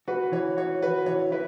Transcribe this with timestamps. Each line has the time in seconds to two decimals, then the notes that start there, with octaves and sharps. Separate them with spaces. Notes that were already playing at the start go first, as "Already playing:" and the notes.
0.08 F#4 B4
0.32 E3 C#5
0.57 F#4 C#5
0.82 F#4 B4
1.06 E3 C#5
1.32 E4 B4